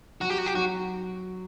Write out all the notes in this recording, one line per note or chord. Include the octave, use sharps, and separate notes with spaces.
F#3 F#4
G4
F#4
G4
F#3 F#4